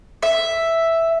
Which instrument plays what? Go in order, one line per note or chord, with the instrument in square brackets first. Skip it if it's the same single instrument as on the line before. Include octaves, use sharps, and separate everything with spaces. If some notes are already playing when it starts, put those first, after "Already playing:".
[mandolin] E5